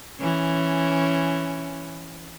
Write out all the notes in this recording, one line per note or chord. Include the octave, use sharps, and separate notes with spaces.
E3 C#4